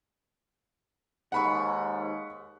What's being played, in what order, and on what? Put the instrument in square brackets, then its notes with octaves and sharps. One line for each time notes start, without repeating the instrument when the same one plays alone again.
[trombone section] D#2 G#2 [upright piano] F#5 B5 C#6